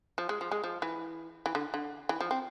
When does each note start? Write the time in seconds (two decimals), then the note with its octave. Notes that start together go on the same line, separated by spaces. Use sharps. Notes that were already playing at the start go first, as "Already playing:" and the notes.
0.18 F3
0.29 G#3
0.41 F3
0.52 G#3
0.64 F3
0.82 E3
1.46 E3
1.55 D3
1.74 D3
2.09 E3
2.21 F3
2.31 C4